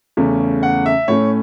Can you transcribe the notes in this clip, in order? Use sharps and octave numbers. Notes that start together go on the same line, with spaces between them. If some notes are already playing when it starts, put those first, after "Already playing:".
E2 C#3 A3 C#4
F#5
E5
A2 A3 C#4 C#5